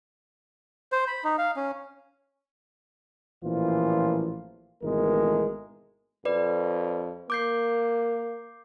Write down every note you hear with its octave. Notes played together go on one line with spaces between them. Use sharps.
C5
B5
D#4
F5
C#4
A1 A#2 E3 F3 F4 C5
G#1 B2 E3 G#3 A3 A#4
F2 B4 D5
A#3 D6 G6 C7